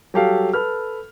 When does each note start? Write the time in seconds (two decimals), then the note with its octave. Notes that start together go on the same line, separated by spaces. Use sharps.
0.14 F#3 G3 G4 A4 F5
0.54 A4 B4 F6